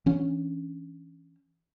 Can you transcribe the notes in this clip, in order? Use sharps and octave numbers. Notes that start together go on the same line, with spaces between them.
E3 C#4 D4